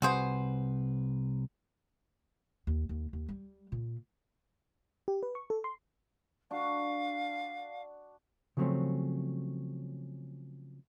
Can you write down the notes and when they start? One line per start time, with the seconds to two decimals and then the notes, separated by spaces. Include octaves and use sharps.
0.02 C2 C3 F#4 G#4 B4 C5
2.67 D#2
2.89 D#2
3.13 D#2
3.29 G3
3.72 A#2
5.08 G4
5.23 B4
5.35 C#6
5.50 A4
5.64 C6
6.51 D4 F#4 F5
8.57 C#3 F3 F#3 A3 C4 C#4